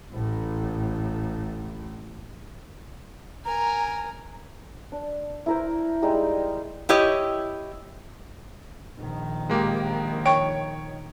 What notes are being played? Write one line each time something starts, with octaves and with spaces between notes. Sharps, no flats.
A1 A2
A#4 G#5 A#5
D4
E4 A#4 C5
G3 G#3 D#4
E4 G4 C#5 D#5
A#1 D#3
G#3 A#3 G4
C#5 G5 C#6 D7